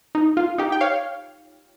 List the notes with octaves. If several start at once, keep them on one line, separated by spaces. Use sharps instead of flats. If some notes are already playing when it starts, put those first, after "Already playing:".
D#4
F4
D#4 G4
G5
C#5 F5